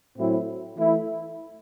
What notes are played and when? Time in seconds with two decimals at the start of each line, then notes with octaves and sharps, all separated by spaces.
0.18 A2 F#3 C4 E4
0.76 E3 A3 E4